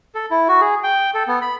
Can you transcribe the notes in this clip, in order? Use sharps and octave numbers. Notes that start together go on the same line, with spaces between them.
A4
E4
F#4
G#4
G5
A4
B3
B5